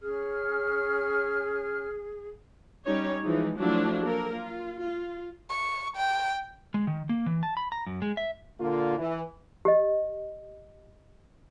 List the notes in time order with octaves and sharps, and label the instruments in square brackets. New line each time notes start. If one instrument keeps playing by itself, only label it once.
[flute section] C#4 F6 [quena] G#4
[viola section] G3 C#4 D#4 C#5
E3 F3 G#3 D#4
F3 F#3 A3 D4 E4 F4
A#3 A4 A#4
F4
F4
[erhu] C#6
G5
[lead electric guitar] G#3
D#3
A#3
E3
A5
B5
A#5
F#2
G#3
E5
[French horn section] A#2 D3 A#3 F4
E3
[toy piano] G4 D#5